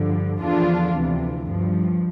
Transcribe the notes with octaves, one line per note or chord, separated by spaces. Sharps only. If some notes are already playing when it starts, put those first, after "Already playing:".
Already playing: G2 D3 F3
E2 D3 F3 D4 F4
D2 C3 E3
G2 F3